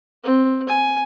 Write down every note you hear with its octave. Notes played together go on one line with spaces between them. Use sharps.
C4
G#5